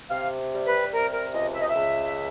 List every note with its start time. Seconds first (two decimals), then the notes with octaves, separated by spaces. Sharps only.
0.10 C3 F5
0.52 G3
0.66 B4
0.93 C3 A#4
1.13 A#4
1.33 C#2 D#5
1.54 E5
1.61 D#5
1.69 E5
1.75 C#2